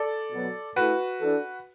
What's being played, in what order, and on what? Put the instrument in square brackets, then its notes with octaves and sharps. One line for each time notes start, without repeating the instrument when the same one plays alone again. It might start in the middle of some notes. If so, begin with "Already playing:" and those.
Already playing: [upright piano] A4 D5
[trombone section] B2 F#3 B3
[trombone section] A3 E4 A4 [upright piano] F#4 B4
[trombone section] E3 D4 A4